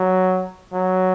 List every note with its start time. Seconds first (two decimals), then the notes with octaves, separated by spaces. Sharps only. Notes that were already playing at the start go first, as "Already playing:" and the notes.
Already playing: F#3
0.73 F#3